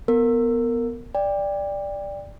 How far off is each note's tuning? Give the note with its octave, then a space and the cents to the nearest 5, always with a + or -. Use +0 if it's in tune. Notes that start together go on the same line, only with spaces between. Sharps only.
B3 +0 A#4 -25
D5 +0 G5 +25